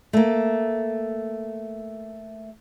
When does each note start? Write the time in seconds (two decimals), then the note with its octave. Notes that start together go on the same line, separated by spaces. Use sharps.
0.13 A3 A#3